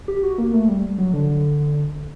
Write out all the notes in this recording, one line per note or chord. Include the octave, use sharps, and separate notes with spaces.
G4
F#4
A#3
A3
G3
F#3
D3